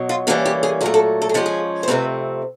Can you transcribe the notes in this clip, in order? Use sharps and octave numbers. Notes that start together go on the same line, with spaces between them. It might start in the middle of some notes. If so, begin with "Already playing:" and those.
Already playing: B2 F#3
F4
A2 E3 G3 A#3 C#4 F#4
G4
G#4
A#2 F#3 A3 G#4
A4
A4
G#4
C#3 F3 G#3 C#4 G4
G#4
C5
F2 C3 F3 A3 C4 B4